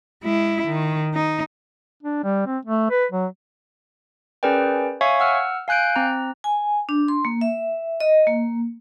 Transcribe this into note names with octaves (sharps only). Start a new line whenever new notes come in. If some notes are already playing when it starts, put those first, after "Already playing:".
G#3 E4
D#3
D#4
D4
G3
C4
A3
B4
F#3
C#4 G#4 A#4 B4 D5 G5
C#5 E5 F5 G#5 C#6
F#5 E6 F6
F5 G#5 F#6 G6 D7
C4 A#5
G#5
D4
C6
A#3
E5
D#5
A#3